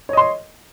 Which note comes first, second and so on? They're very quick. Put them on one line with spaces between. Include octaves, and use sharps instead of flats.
C#5 D#5 C6